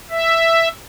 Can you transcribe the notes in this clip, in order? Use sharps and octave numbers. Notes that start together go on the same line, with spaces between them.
E5